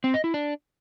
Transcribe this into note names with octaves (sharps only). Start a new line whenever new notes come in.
C4
D#5
E4
D4